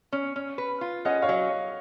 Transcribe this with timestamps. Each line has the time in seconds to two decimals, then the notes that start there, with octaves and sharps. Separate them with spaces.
0.12 C#4
0.36 C#4
0.58 B4
0.81 F4
1.05 C#4 D#5 F#5
1.22 C#5 F5
1.29 F#3